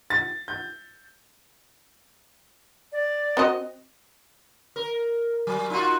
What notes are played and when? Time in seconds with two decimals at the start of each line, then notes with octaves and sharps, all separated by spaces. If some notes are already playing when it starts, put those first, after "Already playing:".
0.10 A6
0.48 G6
2.92 D5
3.37 C4 F#4 D#5
4.76 A#4
5.47 F#3
5.70 D#4 F4 F#4